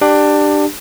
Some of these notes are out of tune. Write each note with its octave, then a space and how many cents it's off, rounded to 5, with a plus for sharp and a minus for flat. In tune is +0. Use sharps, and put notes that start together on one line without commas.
D4 +20 G4 +0